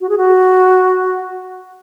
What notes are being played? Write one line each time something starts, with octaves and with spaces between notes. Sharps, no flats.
F#4
G#4
F#4